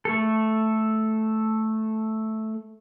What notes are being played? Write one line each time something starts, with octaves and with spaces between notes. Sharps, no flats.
A3 A4